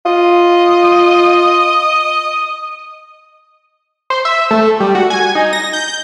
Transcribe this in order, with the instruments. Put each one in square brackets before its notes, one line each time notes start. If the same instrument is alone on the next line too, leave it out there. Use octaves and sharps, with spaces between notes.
[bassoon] F4 [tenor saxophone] D#5
[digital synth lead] C5
E5
A3
G3
F#4
G#5
D#4
A#6
G6